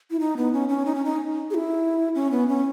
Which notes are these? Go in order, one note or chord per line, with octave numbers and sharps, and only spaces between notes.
E4
D#4
B3
C#4
C#4
D#4
C#4
D#4
G#4
E4
C#4
B3
C#4